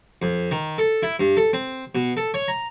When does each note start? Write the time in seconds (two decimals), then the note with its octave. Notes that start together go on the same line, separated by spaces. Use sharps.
0.22 F2
0.51 D#3
0.78 A4
1.03 E4
1.20 G2
1.37 A4
1.53 C4
1.95 B2
2.17 A4
2.34 C#5
2.48 A#5